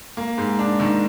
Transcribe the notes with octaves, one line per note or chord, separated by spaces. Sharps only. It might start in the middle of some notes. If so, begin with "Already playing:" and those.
A#3
G#2
D4
D#3